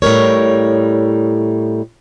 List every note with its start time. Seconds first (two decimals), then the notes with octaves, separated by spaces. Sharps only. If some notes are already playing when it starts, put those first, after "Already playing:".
0.02 A2 G3 A#4 C#5